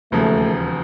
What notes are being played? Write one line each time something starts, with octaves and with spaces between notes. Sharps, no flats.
E1 D#2 C#3 F3 A3